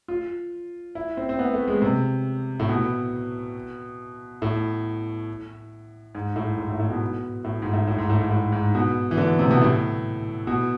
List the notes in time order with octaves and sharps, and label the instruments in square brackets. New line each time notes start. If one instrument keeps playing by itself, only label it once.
[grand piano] F4
E4
C4
C4
B3
A3
G#3
C3
A2
B2
A2
G#2
A2
G#2
A2
A2
B2
A2
G#2
A2
A2
G#2
A2
G#2
A2
G#2
B2
E3
D3
C3
B2
A2
B2